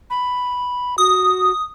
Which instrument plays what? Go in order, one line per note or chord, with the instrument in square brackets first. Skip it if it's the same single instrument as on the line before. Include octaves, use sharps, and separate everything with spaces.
[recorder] B5
[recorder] F#4 [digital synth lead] D#6